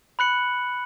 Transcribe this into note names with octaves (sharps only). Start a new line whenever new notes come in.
B5 F#6 C#7 F#7